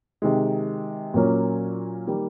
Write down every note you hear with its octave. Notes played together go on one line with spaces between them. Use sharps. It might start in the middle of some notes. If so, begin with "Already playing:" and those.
C3 D#3 G#3
A#2 F#3 A#3 C#4
D#3 G3 A#3